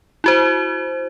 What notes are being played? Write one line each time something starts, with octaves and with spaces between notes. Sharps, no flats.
E4 F#4 C5